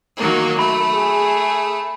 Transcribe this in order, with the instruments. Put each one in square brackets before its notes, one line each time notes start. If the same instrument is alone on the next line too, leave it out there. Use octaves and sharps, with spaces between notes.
[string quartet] D#3 F#3 A#3
[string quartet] A3 [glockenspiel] B5
[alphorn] G#4